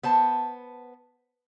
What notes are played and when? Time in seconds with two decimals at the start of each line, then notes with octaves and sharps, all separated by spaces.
0.03 B3 C5 A5